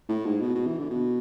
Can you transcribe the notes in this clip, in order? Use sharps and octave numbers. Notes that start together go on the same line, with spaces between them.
A2
G#2
B2
B2
E3
D3
B2